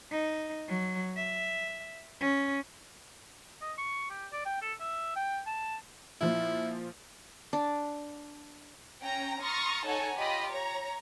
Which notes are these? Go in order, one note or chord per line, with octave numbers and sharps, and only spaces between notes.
D#4
F#3
E5
C#4
D#5
C#6
G4
D5
G5
A4
E5
G5
A5
A#2 F3 E4
D4
C#4 G5 A#5
A#5 C6 C#6 D#6 F6 A6
D#4 A4 C#5 F#5 G#5 A#5
F4 G4 D#5 B5
C#5 A#5